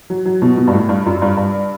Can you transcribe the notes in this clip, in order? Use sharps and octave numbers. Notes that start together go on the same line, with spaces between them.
F#3
F#3
B2
B2
G2
A2
G2
F#2
G2
G2